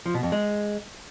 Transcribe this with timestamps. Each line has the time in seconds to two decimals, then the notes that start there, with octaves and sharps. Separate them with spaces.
0.06 F3
0.14 B2
0.23 F2
0.32 G#3